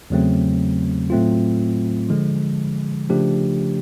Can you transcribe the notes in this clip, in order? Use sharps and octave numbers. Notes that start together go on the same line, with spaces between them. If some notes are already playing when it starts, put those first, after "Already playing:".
E2 C#3 F#3 A3 C4
A2 F#3 A3 C4 F4
D3 F3 G#3
C#3 F3 A3 D4 G4